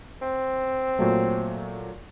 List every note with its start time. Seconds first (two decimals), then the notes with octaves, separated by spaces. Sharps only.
0.22 C4
0.99 A#2 F#3 A3